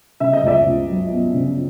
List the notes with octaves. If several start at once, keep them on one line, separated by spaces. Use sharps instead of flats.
C#3 E5
D#5
C#2 D5 E5
C#2
F#3
B3
C#3